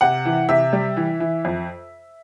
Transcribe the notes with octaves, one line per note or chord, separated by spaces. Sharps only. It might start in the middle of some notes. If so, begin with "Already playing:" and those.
C3 F#5
E3
C3 E5
G3
E3
E3
F2